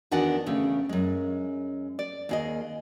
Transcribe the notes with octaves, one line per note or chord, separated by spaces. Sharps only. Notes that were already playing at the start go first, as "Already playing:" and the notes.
E2 D#3 D4 F#4 F#5 G#5
E2 C#3 A3
F#2 G#3
D5
D#2 G#4 D#5